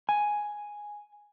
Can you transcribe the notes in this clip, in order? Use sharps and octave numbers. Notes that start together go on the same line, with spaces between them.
G#5